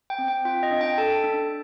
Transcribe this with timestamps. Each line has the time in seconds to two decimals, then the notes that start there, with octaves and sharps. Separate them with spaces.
0.10 G5
0.18 C4
0.28 G5
0.45 F4 G5
0.63 D#5
0.71 D4
0.81 G5
0.98 A4 A5
1.24 D4